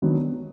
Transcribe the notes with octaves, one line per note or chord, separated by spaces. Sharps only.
D#3 F#3 B3 D4